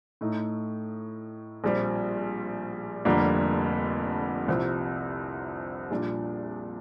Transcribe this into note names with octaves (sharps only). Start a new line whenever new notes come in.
A2 A3 D#4
A#1 A#2 G3 C4
F1 F2 D3 G3 A#3
C2 C3 F3
A#1 A#2 G3 D4